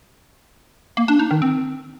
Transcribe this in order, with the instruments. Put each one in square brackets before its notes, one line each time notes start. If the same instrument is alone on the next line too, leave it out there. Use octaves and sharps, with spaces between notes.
[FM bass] A#3
D4
D#4
D#3
C4